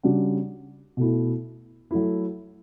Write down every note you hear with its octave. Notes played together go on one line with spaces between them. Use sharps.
C#3 G3 D4 F#4
B2 A3 E4
F#3 A3 E4